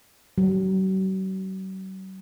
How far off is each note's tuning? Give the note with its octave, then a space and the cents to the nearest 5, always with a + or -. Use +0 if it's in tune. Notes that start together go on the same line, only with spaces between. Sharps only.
F#3 +45